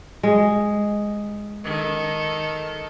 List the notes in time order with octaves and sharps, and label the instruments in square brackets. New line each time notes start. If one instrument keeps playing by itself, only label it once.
[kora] G#3
[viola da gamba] D#3 A4